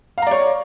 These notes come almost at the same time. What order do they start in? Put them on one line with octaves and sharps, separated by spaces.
F5 A#5 D5 C#5